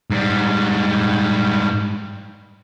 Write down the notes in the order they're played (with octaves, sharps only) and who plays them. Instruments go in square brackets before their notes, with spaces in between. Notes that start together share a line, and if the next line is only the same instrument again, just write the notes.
[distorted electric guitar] G#2 G3